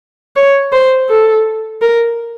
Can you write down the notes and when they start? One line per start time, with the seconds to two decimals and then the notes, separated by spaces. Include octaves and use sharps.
0.36 C#5
0.72 C5
1.09 A4
1.82 A#4